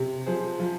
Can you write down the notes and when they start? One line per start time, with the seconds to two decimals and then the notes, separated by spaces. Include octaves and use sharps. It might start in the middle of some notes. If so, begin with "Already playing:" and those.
Already playing: C3
0.26 F3 G#4 C5
0.60 F3